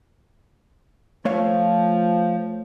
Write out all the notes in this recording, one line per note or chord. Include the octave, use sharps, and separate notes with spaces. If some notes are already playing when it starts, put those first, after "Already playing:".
F3 A3 C#5 F5